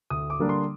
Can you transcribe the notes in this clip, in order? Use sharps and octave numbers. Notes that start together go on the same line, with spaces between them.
D2 D#6
D6
D3 G3 A#3 D4
C6